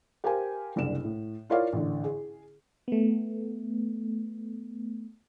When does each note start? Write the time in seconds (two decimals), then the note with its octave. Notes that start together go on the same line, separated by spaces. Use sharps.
0.24 G4 A#4 C5 F5 G5 G#5
0.76 F#1 C2 D4 E7
1.04 A2
1.50 E4 F4 A#4 C#5 D5 F5
1.73 A1 D3
2.04 G#4
2.88 A3 B3